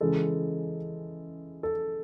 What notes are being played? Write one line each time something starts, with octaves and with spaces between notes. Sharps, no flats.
C#3 E3 G#3 A4
A4